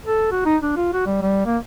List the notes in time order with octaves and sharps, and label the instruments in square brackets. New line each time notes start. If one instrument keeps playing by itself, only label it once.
[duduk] A4
F#4
D#4
D4
F4
F#4
G3
G3
A#3